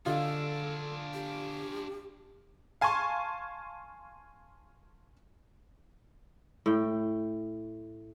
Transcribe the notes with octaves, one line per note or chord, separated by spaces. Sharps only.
D3 D4 F4 G#4 A4 D5 D#5
G4
F5 G#5 A5 C6 C#6
A2 G5